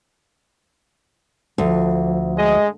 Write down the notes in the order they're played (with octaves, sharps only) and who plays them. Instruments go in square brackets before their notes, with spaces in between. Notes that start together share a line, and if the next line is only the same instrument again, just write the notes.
[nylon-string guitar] D2 [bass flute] F3
[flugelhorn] G#3 [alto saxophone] D#5